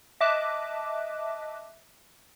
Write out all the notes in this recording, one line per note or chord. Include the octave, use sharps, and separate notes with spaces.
D#5 E5 A5 D6 F#6